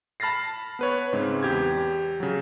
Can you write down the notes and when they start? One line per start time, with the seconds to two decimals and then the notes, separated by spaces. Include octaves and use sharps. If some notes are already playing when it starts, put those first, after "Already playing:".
0.20 A5 B5 F6 A6 A#6 C7
0.79 B3 B4 C#5
1.13 G#2 C#3 G#3 C4
1.43 E2 G4 G#6
2.20 C#3 F#3